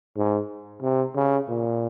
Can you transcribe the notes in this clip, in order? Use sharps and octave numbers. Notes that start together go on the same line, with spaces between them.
G#2
C3
C#3
A#2